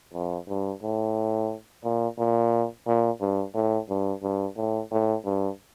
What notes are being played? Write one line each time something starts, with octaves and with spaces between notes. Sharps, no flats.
F2
G2
A2
A#2
A#2
A#2
G2
A2
G2
G2
A2
A2
G2